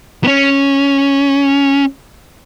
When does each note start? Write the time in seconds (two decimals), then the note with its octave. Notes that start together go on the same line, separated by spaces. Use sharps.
0.24 B3
0.27 C#4